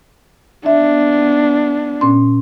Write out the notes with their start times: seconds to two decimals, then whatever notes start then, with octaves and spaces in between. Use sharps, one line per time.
0.66 B3 D4 E5
2.01 A#2 C#4 C6